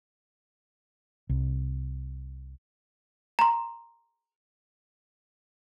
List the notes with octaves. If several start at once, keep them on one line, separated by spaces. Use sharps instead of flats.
C2
A#5 C6